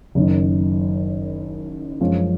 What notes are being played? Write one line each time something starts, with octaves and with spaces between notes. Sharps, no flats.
F#1 F#2 D#3
F#2 F3 G#3 C#4 F4